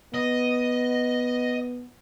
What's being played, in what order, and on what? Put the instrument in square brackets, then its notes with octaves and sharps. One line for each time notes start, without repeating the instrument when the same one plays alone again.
[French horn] B3 [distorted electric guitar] D#5